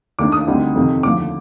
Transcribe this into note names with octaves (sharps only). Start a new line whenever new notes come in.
D#2 D#3 A3 D4 D6
D#6
D2 D3 G3 C4 D#4
F2 C3 D#3
D#2 D3 F3 A3 D6